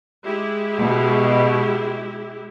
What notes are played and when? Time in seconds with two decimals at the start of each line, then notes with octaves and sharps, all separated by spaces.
0.23 G#3 E4 G4
0.80 B2